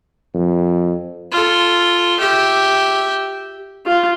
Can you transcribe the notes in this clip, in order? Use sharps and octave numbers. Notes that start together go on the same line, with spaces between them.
F2
F4 A4
G4 E5
F4